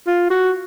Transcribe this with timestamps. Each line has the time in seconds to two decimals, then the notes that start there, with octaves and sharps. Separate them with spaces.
0.07 F4
0.30 F#4